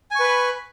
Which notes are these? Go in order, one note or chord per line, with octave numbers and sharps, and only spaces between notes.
B4 G#5 B5 C#6